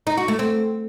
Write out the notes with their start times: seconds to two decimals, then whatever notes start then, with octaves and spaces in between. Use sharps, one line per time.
0.07 D#4
0.17 F#4
0.28 A3
0.39 C4